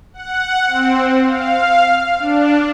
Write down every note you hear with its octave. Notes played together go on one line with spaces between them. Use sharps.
F#5
C4
F5
D4